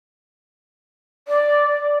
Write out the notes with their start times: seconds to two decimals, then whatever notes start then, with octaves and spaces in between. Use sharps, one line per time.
1.28 D5